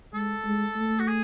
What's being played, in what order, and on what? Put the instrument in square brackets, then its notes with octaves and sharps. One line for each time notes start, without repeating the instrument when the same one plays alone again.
[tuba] G#3 [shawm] A4
[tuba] G#3
A3
[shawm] F#4
G#4